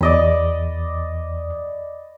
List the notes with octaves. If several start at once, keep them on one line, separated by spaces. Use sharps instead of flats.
E2 D5 D#5 B5